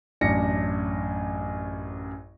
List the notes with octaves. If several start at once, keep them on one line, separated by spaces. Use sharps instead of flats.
A1 F#2 D4 A#6 C#7